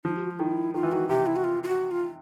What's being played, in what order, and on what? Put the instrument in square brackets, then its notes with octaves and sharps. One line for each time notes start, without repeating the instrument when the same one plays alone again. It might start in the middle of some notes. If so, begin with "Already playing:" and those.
[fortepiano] F3 [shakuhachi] D#4
[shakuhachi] G4
F#4
F4
[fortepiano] D#3 [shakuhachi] E4
[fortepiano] D#3 [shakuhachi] F4
[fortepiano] E3
[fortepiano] D#3 [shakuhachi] F#4
[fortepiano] C3 [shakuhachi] G4
[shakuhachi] E4
F#4
F4
F4
F#4
F4